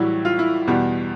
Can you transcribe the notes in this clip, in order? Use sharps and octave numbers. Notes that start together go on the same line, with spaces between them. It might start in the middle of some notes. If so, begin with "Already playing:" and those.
Already playing: A2 E3 F#3 G3 F#4
F4
E4
E2 B2 G3